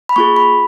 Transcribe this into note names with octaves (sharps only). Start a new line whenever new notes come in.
B5
A#3 F4 G#4 C#6
B5